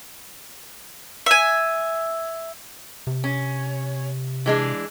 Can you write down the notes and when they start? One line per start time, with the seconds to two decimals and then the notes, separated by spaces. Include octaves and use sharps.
1.26 E5 G#5
3.07 C3
3.24 C#4
4.46 E3 G#3 D4